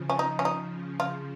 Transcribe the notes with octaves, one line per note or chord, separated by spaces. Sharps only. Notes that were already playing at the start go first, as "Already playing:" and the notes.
Already playing: C#3 F3
C#4
C#3 D#4
C#4
D#4
F4